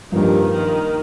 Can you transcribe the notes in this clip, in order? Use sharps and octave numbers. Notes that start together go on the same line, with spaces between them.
G2 D#3 F3 A#3 D4 G4
D#3